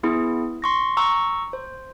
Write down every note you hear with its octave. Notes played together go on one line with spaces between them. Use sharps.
B3 E4 G#4
C6 C#6 A#6
A#5 C#6 E6
C5